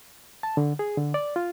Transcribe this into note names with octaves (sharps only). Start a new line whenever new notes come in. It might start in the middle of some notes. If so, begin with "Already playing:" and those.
A5
D3
G#4
D3
D5
F4